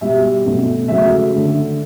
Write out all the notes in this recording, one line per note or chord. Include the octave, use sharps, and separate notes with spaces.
B2 G3 E5
B2 F#3 A3
C#3 F#3 A3 E5
D3 A3